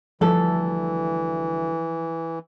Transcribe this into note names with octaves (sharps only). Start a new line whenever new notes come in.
D2 E3 F3 G3 A4